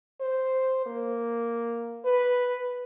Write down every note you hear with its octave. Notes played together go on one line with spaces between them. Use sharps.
C5
A#3
B4